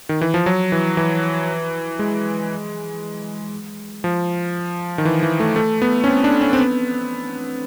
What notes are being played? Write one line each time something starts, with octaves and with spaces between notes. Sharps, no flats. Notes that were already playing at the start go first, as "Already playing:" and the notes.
D#3
E3
F3
F#3
E3
E3
G#3
F3
D#3
E3
E3
A3
A3
B3
C#4
C4
D4
C#4
C4
B3